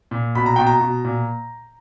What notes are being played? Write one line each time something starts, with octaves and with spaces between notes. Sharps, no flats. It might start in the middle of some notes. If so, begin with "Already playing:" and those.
A#2
B2 B5
A#5
B2 G5
A#5
B2
A#2